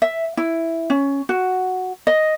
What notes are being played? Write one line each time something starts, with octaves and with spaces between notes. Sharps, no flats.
E5
E4
C#4
F#4
D#5